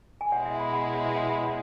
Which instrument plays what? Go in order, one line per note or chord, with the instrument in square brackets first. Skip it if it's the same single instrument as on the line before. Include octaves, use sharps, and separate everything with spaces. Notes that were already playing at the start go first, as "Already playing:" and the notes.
[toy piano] G#5
[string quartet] B2 G#3 E4 [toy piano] C#5 F#5
[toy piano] E5 G#5
F#5 B5
F#5 B5
C#5 F#5
B4 E5
C#5 F#5
F#5 B5
C#5 F#5